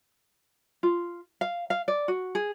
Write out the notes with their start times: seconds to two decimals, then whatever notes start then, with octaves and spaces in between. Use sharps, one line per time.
0.83 F4
1.41 F5
1.70 F5
1.88 D5
2.08 F#4
2.35 G#4